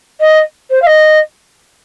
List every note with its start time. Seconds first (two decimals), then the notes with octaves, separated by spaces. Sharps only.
0.20 D#5
0.70 C5
0.82 F5
0.86 D#5